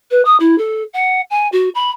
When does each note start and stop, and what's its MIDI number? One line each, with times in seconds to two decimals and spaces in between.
0.11 0.22 71
0.25 0.36 87
0.40 0.58 64
0.58 0.84 69
0.94 1.21 78
1.30 1.48 80
1.52 1.69 66
1.75 1.90 83